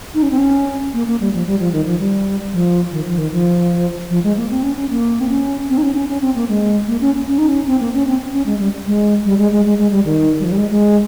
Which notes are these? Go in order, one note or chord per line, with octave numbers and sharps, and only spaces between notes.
D#4
C#4
C4
C#4
A#3
A#3
G3
F3
G3
F3
D#3
F3
G3
F3
D#3
F3
D#3
F3
F3
G#3
A#3
C4
C#4
C#4
A#3
C4
C#4
C4
D#4
C#4
C#4
C#4
C4
A#3
G#3
A#3
C#4
C#4
D#4
C#4
C4
A#3
C#4
C4
C#4
G#3
G3
G#3
G3
G#3
G#3
G#3
G#3
G3
D#3
G3
F3
G3
G#3
G#3